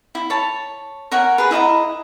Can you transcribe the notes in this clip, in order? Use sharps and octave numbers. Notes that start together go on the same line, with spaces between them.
E4
C#5 A5
A#4 C#5 F#5 G#5
G#4 B4
E4 D#5 F#5 A#5